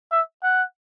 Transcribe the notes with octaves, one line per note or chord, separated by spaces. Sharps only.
E5
F#5